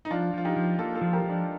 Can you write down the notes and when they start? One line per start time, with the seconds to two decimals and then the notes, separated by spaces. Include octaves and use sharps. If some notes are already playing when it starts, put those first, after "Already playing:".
0.05 D#4
0.10 F3 D4 F4
0.34 F3 F4
0.45 D#4 G4
0.56 F3
0.78 A#3 F4 A4
0.95 F4 A4
1.01 F3
1.13 G4 A#4
1.24 F3
1.30 D4